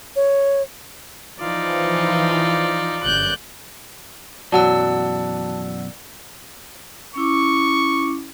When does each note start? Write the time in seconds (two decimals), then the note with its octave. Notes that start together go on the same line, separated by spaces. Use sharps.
0.16 C#5
1.41 E3 F3 D#4 F4 D5
3.03 G1 F#2 F#6 G6
4.52 F#2 B2 E3 F#3 D5 F#5 A5 E6
7.16 C#4 E4 C#6 D6